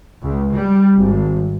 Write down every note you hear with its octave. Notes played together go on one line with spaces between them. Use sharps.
C#2
G3
G#1